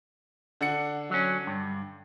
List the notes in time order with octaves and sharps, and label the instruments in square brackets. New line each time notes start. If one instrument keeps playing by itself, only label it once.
[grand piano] D3 F#5 C#7
[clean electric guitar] F#3 C#4
G2